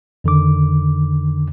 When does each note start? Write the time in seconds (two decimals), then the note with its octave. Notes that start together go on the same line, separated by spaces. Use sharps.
0.24 F2 D3 D#3 D6